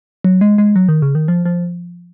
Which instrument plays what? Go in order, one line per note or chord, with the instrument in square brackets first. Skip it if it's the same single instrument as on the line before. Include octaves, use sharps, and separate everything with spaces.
[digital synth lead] F#3
G#3
G#3
F#3
D#3
C#3
D#3
F3
F3